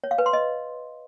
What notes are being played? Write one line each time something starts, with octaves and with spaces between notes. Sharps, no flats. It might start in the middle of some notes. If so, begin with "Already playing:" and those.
C#5
F5
B4
C6
D#5